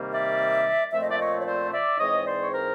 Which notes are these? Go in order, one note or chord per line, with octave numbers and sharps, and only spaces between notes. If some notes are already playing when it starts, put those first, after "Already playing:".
Already playing: C3 D#3 G3 A#3
D5 E5
A#2 F3 A3 C4 E5
D#5
D5 E5
C#5 D#5
C#5
C5 D5
D5 E5
G#2 E3 G#3 C4 C#5 D#5
C5 D5
C#5
A#4 C5